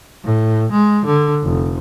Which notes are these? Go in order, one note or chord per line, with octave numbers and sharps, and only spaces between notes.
A2
G#3
D3
F1